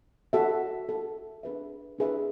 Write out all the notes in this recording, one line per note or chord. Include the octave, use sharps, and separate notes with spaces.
F#4 A4 E5
F#4 A4 E5
D4 G#4 B4 E5
D4 G#4 B4 E5